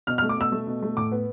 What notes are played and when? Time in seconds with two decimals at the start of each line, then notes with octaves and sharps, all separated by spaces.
0.07 B2 F6
0.18 F6
0.22 A3
0.29 D6
0.37 B2 E6
0.52 A3
0.67 B2
0.82 A3
0.97 A2 D6
1.12 B3